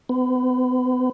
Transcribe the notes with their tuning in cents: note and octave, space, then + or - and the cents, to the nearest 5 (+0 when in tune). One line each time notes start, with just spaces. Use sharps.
B3 +40